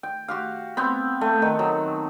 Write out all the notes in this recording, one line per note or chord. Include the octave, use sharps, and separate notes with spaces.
G5
F#4 G4 F5
B3 C4 G5
A3
D#3
F#3